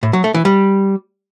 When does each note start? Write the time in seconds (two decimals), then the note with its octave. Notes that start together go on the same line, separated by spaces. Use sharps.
0.03 A2
0.13 F#3
0.24 A3
0.34 E3
0.45 G3